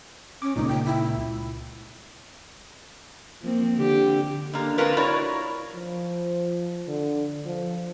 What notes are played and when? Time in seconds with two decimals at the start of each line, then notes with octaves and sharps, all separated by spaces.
0.42 C#4 D6
0.56 C#2 A#2 D#4
0.68 G5
0.85 E4
3.42 F3 A#3 C4
3.76 D3 G4
4.53 D3 A#3
4.78 A#3 C4 D4 F4 A#4 B4
4.97 E4 F#4 A#4 C#5 D5
5.75 F3
6.88 D3
7.45 F3